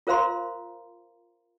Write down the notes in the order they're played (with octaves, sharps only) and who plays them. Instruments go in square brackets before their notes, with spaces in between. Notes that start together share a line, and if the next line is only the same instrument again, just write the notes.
[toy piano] F4 A#4 C5 F5 A#5 C6